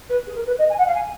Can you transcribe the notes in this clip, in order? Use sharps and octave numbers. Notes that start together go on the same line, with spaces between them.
B4
G#4
A#4
B4
D#5
G#5
F#5
F5
G#5